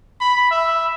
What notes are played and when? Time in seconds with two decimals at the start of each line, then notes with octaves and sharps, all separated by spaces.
0.21 B5
0.51 E5